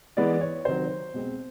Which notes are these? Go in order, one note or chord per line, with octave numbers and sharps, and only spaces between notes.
E3 G#3 B3 D5
C#5
C3 D#3 F#3 C5
B2 G#3 C4